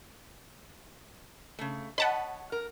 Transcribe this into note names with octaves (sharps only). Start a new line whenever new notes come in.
C#3 A3
C#5 D#5 F#5 A5 B5
A#4